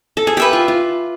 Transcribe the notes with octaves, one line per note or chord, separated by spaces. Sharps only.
A4
G#4
G4 B4 E5 G5
F4
F4